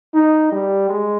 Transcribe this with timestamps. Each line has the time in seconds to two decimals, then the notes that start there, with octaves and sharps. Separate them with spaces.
0.14 D#4
0.52 G3
0.89 G#3